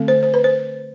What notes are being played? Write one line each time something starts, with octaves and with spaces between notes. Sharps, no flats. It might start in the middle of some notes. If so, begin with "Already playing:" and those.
Already playing: D3 A3 C4
C5
C5
B4
C5